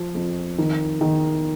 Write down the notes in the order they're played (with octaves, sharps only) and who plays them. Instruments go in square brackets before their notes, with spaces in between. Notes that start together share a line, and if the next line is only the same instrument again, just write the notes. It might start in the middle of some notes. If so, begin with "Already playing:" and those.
Already playing: [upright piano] F3
F2
D#3
D#3